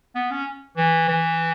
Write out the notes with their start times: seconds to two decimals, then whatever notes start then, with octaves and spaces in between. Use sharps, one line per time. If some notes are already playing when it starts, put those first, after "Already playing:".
0.15 B3
0.31 C#4
0.77 E3
1.08 E3